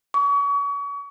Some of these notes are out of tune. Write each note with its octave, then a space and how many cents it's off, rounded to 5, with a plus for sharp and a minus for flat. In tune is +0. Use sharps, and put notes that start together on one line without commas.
C#6 +35